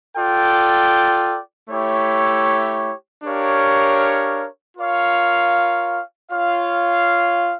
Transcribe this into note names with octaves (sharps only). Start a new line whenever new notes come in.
F4 A4 D5 G5
A3 E4 G4 C#5
D4 G4 A#4 C#5 F5
F4 A#4 C#5 F5
F4 C#5 F5